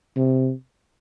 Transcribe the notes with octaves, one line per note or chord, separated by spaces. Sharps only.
C3